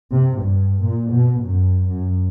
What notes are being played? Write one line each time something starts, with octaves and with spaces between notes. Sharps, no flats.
C3
G2
A#2
B2
F#2
F#2